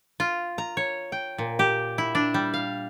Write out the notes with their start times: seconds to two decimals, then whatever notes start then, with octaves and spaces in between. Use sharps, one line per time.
0.20 F4
0.58 A#5
0.77 C#5
1.12 G5
1.38 A#2
1.59 G4
1.98 E4
2.15 D4
2.34 G3
2.54 F5